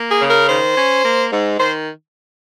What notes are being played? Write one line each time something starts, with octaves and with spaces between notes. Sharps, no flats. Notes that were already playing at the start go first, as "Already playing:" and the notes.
Already playing: A#3
G#4
C#3
A#4
D#3 C5
C#4
A#3
G#2
D#3 C5